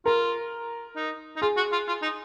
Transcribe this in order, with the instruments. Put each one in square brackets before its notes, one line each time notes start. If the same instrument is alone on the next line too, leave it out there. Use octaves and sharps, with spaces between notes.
[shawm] F4 [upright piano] A#4
[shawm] D#4
D#4
[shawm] F4 [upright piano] G#4
[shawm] F#4
F4
F4
D#4